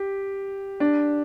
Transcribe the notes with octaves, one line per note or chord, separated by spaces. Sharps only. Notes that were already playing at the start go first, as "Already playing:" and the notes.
Already playing: G4
D4